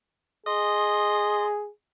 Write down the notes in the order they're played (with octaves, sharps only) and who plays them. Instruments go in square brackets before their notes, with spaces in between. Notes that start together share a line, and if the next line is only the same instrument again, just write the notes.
[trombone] G#4 [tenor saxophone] D#5 [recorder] C6